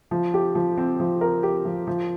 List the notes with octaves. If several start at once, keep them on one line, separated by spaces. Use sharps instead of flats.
F3
G4
F3
C4
F3
A#4
G4
F3
F3